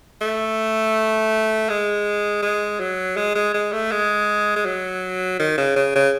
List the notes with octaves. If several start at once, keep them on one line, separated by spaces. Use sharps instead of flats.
A3
G#3
G#3
F#3
G#3
G#3
G#3
A3
G#3
G#3
F#3
D#3
C#3
C#3
C#3